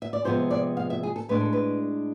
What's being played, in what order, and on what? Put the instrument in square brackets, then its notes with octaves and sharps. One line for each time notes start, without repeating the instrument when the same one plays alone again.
[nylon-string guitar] E5
D5
C3 F3 G#3 B3 C5
D5
F5
E5
G#4
A4
A2 G#3 D4 B4
A4
B4